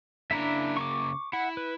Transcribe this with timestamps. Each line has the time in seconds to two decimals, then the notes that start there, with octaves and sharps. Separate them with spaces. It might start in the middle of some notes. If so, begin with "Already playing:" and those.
0.31 C#3 A#3 D4 E4 E5 A#5
0.77 C#6 D6
1.33 E4 F#5
1.57 B4